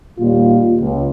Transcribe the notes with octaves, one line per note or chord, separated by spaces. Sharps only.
D#2 A#2 G3 F4
C#2